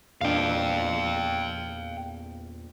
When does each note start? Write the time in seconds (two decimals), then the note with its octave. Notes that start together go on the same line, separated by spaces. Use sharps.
0.21 E2 A#2 D4 F5 G5